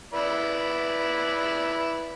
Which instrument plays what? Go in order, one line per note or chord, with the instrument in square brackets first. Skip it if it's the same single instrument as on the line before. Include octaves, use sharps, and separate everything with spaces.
[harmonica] E4 B4 D5